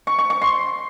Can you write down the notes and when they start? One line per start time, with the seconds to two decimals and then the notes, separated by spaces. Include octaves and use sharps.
0.07 C#6
0.19 C#6
0.30 C#6
0.42 C6